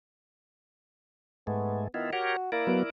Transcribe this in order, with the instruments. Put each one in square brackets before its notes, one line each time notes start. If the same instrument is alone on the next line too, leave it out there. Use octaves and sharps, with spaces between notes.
[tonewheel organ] G#2 G#3 A3 [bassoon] B3
[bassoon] D#3 [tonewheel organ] B3 E4 F4
[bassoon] F#4 [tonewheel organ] G4 A#4 C#5
[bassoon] A#3 [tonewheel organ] E4 A#4 D5
[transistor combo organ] F#3 B3